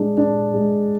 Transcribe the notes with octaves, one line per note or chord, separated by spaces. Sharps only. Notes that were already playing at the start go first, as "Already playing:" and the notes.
Already playing: G#3 D4
D4
G#3